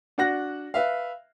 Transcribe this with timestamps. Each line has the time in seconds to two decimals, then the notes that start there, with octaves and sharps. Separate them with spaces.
0.18 D4 F#4 F#5 F#6 A#6
0.74 B4 E5 F5